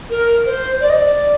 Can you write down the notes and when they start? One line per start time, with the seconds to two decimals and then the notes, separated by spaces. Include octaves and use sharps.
0.10 A#4
0.46 C5
0.81 D5
0.90 D#5
0.97 D5